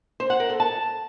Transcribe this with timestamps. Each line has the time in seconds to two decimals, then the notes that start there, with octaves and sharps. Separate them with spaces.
0.20 C5
0.30 F#5
0.40 A#4
0.50 A4
0.60 A5